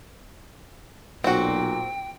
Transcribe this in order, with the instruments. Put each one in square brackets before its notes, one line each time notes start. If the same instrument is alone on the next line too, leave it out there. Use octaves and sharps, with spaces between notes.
[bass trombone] B1 [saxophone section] A#2 [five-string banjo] C4 F#4 [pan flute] G5